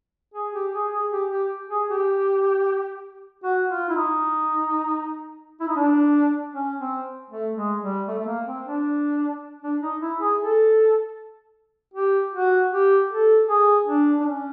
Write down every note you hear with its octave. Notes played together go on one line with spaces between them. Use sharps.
G#4
G4
G#4
G#4
G4
G4
G#4
G4
F#4
F4
E4
D#4
E4
D#4
D4
C#4
C4
A3
G#3
G3
A3
A3
A#3
C4
D4
D4
D#4
E4
G#4
A4
G4
F#4
G4
A4
G#4
D4
D4
C#4